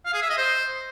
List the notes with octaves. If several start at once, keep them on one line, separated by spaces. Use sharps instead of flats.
F5
G#4
E5
D#5
C5